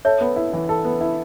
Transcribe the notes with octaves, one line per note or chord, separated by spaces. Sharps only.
A4 C#5 E5
B3
E4
E3
A4
B3
E4